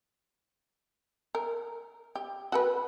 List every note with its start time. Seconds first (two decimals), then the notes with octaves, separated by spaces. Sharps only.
1.35 A#4
2.15 G4
2.52 F#4 A4 B4